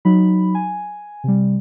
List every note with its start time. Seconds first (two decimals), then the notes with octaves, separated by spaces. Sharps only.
0.05 F#3 D#4 B5
0.55 G#5
1.24 C3 G3